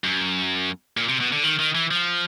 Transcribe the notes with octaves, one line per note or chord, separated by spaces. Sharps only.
F#2
A#2
C3
B2
D3
D#3
D#3
E3
F3